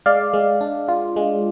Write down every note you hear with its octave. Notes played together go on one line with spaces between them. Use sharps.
G#3 D5 F5
G#3
D4
F4
G#3